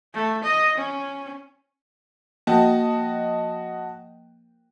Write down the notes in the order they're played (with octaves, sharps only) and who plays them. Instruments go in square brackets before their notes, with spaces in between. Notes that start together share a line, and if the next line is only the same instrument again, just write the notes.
[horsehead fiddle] A3
D#5
C#4
[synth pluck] F3 A#3 G5 [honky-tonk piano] F#4 D#5 A5